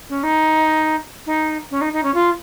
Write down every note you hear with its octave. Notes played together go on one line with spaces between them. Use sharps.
C#4
D#4
D#4
C#4
D#4
D#4
C#4
F4